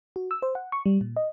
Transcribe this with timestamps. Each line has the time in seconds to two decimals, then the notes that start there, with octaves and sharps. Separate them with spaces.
0.16 F#4
0.31 E6
0.42 C5
0.55 F#5
0.72 C#6
0.86 G3
1.01 A#2
1.17 D#5